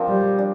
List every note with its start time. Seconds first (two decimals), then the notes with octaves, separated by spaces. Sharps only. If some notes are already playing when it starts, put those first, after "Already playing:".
Already playing: F3 C4 D4 F4 A#4
0.09 G3
0.39 D4